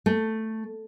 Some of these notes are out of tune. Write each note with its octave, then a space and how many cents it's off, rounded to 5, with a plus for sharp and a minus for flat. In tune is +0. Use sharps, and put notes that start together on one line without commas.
A3 +5